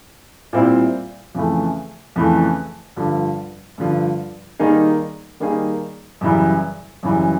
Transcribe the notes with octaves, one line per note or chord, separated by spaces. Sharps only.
A#2 G3 C4 E4
F2 C#3 E3 A3
F2 C#3 E3 A3
G2 D3 F3
G2 D3 F3
D#3 G3 A#3 D#4 G#4
D#3 G3 A#3 D#4 G#4
F#2 C#3 E3 G3
F#2 C#3 E3 G3